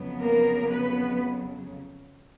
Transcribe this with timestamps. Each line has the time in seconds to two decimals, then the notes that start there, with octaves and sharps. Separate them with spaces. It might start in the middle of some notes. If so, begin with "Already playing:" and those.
Already playing: F2 C#3 F#3 B3
0.19 A#3 A#4
0.71 B3 B4